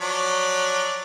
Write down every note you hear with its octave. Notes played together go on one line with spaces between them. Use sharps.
F3 F#3 D5